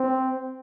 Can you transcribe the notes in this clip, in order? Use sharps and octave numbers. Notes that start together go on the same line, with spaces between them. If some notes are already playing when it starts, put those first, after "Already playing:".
Already playing: C4